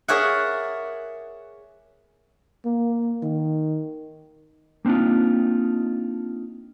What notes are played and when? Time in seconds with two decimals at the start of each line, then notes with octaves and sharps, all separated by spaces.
0.08 G#4 A#4 C#5 D5 E5 F#5
2.65 A#3
3.23 D#3
4.85 A#3 C4 D4 D#4 F4